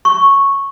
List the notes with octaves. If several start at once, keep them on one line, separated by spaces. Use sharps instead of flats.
C#6